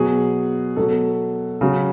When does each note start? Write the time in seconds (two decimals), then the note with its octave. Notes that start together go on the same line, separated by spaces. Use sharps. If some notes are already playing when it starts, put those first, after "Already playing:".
Already playing: B2 F#3 G#4
0.76 B2 F#3 A4
1.61 C#3 F#3